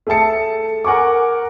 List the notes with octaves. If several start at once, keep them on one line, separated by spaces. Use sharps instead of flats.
A3 G#4 E5 A5 C#7
A#4 F#5 G#5 C#6 D6